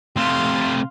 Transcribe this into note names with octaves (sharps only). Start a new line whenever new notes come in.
C3 A3 F5 C6